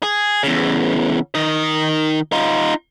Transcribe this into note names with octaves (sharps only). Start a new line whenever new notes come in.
G#4
E2 C#3
D#3 D#5
D#4 F4